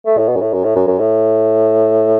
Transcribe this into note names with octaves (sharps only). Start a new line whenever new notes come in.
A3
A2
B2
F#2
A2
F#2
A2
F#2
F#2
A2